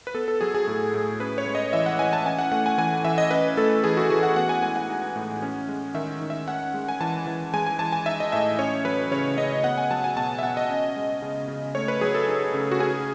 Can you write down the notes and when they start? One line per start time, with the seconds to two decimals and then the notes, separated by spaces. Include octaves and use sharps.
0.07 B4
0.15 B3 A4
0.28 A4
0.41 F#3 G#4
0.55 G#4
0.67 A2
0.94 A2
1.20 C#4 B4
1.38 C#5
1.46 G#3
1.55 D#5
1.73 E3 E5
1.86 F#5
1.99 E3 G#5
2.13 A5
2.25 C#4 G#5
2.39 F#5
2.51 A3 F#5
2.66 G#5
2.78 E3 G#5
3.05 E3 E5
3.18 D#5
3.31 C#4 B4
3.57 A3 A4
3.84 E3 G#4
3.97 F#4
4.10 E3 G#4
4.23 F#5
4.36 B3 F#5
4.49 G#5
4.63 G#3 G#5
4.76 F#5
4.89 D#4
5.16 A2
5.42 C#4
5.69 G#3
5.94 D#3 E5
6.21 D#3
6.30 E5
6.48 C#4 F#5
6.74 G#3
6.89 G#5
7.00 E3 A5
7.27 E3
7.54 G#3 G#5
7.67 G#5
7.79 E3 A5
7.92 G#5
8.06 D#4 E5
8.20 D#5
8.32 A2 E5
8.59 C#4 C#5
8.85 F#3 B4
9.11 C#3 C#5
9.38 C#3 D#5
9.64 B3 F#5
9.78 G#5
9.90 F#3 A5
10.04 G#5
10.17 B2 A5
10.39 E5
10.43 B2 F#5
10.57 D#5
10.70 C#4
10.96 G#3
11.22 C#3
11.48 C#3
11.75 A3 C#5
11.88 B4
12.01 F#3 G#4
12.15 A4
12.28 D#4
12.54 C#3
12.72 F#4
12.80 C#4 G#4